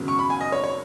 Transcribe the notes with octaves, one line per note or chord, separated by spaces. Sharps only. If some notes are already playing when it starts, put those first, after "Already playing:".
Already playing: G#1 F#2 C#3 F#3 B3
C#6
B5
G#5
D#5
C#5
C#5